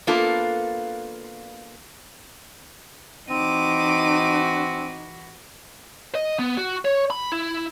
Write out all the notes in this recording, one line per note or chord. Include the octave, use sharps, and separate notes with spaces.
A#3 B3 D4 F4 A4
E3 C4 D#4 F#4 D6 D#7
D#5
B3
F#4
C#5
B5
E4